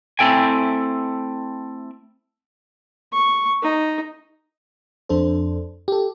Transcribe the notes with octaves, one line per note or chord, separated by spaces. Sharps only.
A3 C4 E4 A4 G5 G#5
C#6
D#4
F2 D4 A4 C5
G4 A4